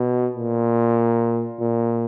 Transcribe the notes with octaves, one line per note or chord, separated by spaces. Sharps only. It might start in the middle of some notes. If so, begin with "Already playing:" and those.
Already playing: B2
A#2
A#2